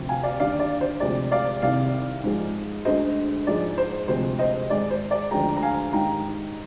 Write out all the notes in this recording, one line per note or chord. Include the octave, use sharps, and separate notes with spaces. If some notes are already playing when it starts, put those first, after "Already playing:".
Already playing: D2 C3 F3
F5 G#5
D5 F5
D#2 D3 G3 D5 F5
D5
C5
D2 C3 F3 G#3 D5
D5 F5
C2 C3 D#3 D5 F5
G#2 F3 G#3
D2 D3 G#3 C5 D#5
G#2 F3 G#3 D5
C5
D2 C3 F3 G#3 C5
C5 D#5
G#2 D#3 G#3 D5
C5
D5
D2 D3 F3 G#3 G5 A#5
A#5
F5 G#5
G#2 D#3 G3 G5 A#5